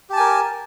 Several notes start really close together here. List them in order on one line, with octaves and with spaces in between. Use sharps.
G4 A5 G#5 A#4